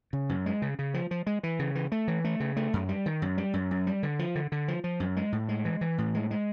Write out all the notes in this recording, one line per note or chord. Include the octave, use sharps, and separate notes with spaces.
C#3
F#2
G#3
C#3
C#3
F3
F3
G#3
E3
C#3
E3
A3
E3
A3
C#3
A3
F#2
G3
D#3
F#2
G3
F#2
F#2
G3
D3
F3
D3
D3
F3
F3
F#2
G#3
A2
G#3
E3
E3
A2
G#3
G#3